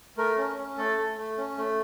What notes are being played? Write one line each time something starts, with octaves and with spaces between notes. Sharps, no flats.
A3 A#4
C#4
C#4
A3 A4
A3
A3
C#4
A3